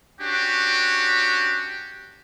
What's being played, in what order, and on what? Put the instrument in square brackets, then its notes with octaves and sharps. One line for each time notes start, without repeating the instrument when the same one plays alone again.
[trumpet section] C#4 D4 F#4 G4